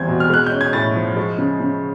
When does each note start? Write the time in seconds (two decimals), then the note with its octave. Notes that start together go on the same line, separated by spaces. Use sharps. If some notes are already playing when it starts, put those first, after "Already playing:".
Already playing: E2 G3 C4 G6 G#6
0.09 B2
0.20 F6
0.30 G#3 F#6
0.46 G6
0.52 C#4
0.61 G#6
0.73 A2 A6
0.96 F3
1.17 G#3
1.38 C#3
1.60 C#3